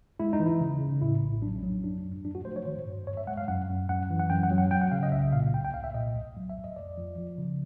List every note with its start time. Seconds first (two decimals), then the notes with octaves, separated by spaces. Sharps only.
0.20 G#3 E4
0.33 D#4
0.40 E3
0.46 E4
0.61 C#3
0.81 C#3
1.02 A2 E4
1.22 A#1
1.42 F#3 D4
1.56 C#4
1.63 F#3
1.83 F#2 D4
2.04 F#2
2.24 F3 D4
2.35 F#4
2.45 A3 C5
2.56 C#5
2.65 D#3 C5
2.87 G2
3.07 G2 C#5
3.17 E5
3.27 G#3 F#5
3.37 F5
3.48 F#2 F#5
3.69 F#2
3.89 F#2 F#5
4.10 E3
4.19 F#5
4.30 F#2 G5
4.43 F#5
4.51 F#3
4.58 F#5
4.71 F#3 G5
4.82 F#5
4.92 C#3 F5
5.03 D#5
5.12 C2 E5
5.33 A#2 F5
5.54 C2 G5
5.65 G5
5.74 C2 F5
5.84 E5
5.94 A#2 D#5
6.15 B1
6.36 F#3
6.50 E5
6.57 B1
6.64 D#5
6.76 F2 D5
6.98 F3
7.18 F3
7.38 C#3